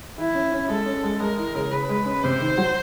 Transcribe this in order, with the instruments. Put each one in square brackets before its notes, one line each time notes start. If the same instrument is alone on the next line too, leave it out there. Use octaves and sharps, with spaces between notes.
[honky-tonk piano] E3 [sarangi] E4
[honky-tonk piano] C#4
C#4
[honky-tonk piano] G#3 [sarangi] A4
[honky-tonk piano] C#4
G#3
[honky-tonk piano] G#3 [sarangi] A#4
[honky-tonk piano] E3
C#3
[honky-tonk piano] C#3 [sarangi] B4
[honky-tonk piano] G#3
C#4
[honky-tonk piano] C3 [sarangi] C5
[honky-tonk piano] D#3
F#3